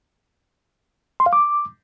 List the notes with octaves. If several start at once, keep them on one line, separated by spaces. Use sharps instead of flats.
C6
F5
D6